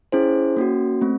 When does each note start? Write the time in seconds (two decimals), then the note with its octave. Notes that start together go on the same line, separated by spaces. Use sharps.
0.12 C#4 E4 G#4 C5
0.57 A#3 C#4 F#4
1.01 A3 C4